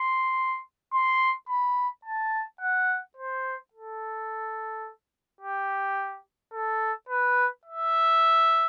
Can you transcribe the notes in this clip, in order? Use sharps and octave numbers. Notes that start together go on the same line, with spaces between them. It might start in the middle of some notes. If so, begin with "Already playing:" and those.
Already playing: C6
C6
B5
A5
F#5
C5
A4
G4
A4
B4
E5